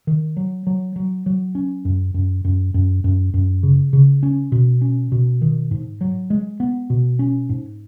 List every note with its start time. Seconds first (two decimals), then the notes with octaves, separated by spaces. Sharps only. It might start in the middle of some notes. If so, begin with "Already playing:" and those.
0.07 D#3
0.37 F#3
0.67 F#3
0.96 F#3
1.26 F#3
1.55 C#4
1.85 F#2
2.14 F#2
2.45 F#2
2.74 F#2
3.04 F#2
3.34 F#2
3.63 C#3
3.93 C#3
4.23 C#4
4.52 B2
4.82 C#4
5.12 B2
5.42 D#3
5.71 G#2
6.01 F#3
6.30 G#3
6.60 B3
6.90 B2
7.19 C#4
7.49 G#2